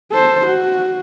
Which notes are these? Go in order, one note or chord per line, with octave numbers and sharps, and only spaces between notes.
A4 C5
F#4